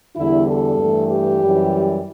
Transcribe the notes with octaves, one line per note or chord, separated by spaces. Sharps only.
E2 D3 G3 E4
A4
G2 E3 A3
G4
F#2 E3 G3